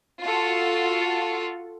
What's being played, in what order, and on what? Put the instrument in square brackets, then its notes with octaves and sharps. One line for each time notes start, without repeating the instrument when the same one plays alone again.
[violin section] F4 F#4 A4